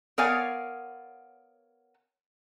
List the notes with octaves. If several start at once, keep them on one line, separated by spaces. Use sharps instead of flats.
B3 A#4 C#5 D5 F5 G#5